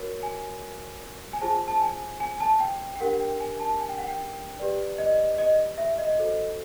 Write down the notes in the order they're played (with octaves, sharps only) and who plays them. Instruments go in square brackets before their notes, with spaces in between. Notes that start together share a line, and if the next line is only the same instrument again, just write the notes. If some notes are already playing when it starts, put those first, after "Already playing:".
Already playing: [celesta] F#4 A#4 C#5
G#5
G#5
F4 G#4 C5 A5
A5
G#5
G#5
A5
G5
G5
D4 G4 A#4 F#5
G5
G#5
A5
G#5
G5
F#5
G5
G4 B4 D5
D#5
D#5
E5
D#5
F#4 A4 C5